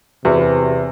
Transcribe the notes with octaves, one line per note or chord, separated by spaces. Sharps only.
E2 C3 F#4 G#4 B4 C5